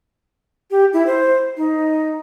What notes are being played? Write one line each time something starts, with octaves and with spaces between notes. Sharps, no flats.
G4
E4
C5
D#4